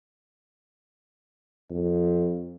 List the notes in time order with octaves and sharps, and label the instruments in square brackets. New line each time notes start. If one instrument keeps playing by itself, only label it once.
[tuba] F2